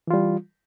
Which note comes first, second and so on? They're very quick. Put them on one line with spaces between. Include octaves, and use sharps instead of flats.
E3 F4 G3